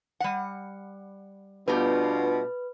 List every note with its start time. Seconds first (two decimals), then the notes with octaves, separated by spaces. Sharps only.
0.20 G3 F#5
1.68 B2 G3 A3 B3 D4 F4 G4 B4